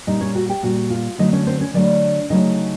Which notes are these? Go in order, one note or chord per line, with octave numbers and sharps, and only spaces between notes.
A#2 G3 D#4 D#5
C#4 C#5
F#4 F#5
G4 G5
A#2 G3 F#4 F#5
F4 F5
D3 F#3 A3 D#4 D#5
C#4 C#5
C4 C5
C#4 C#5
D3 F#3 A3 D4 D5
C#3 F#3 A3 D#4 D#5